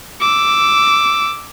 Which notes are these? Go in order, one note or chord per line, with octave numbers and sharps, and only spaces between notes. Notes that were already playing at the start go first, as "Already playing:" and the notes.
D6 E6